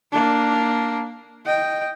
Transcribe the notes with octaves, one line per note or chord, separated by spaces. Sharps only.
A#3 D4
D#5 G5